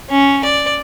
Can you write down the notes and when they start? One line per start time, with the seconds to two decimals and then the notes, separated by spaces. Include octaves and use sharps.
0.10 C#4
0.45 D5